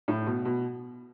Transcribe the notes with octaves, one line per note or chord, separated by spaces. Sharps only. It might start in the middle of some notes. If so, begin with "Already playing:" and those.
A2
B2
B2